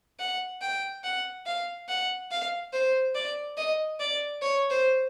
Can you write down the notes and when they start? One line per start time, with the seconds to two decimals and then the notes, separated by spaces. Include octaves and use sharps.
0.19 F#5
0.61 G5
1.04 F#5
1.46 F5
1.89 F#5
2.31 F5
2.73 C5
3.15 D5
3.58 D#5
4.00 D5
4.42 C#5
4.70 C5